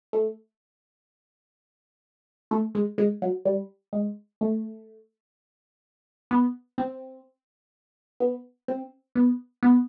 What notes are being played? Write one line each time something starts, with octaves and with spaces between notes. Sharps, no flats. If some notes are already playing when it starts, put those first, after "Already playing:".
A3
A3
G#3
G#3
F#3
G3
G#3
A3
B3
C4
B3
C4
B3
B3